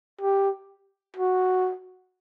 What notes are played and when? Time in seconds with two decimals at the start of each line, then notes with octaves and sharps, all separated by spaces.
0.21 G4
1.16 F#4